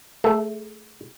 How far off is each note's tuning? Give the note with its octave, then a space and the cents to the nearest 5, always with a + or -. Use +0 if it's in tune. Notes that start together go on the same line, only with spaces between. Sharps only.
A3 -5 G#4 +15